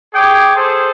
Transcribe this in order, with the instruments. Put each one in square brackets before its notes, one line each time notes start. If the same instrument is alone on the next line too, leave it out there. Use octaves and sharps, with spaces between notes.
[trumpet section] G#4 C#5 G5 D6
G#4 A4 C5